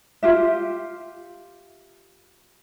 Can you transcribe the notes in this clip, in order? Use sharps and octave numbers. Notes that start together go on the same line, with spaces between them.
F4 G4 E5